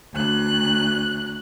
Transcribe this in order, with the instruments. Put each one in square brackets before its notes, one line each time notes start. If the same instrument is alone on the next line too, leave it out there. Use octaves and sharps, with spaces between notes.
[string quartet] D2 F#6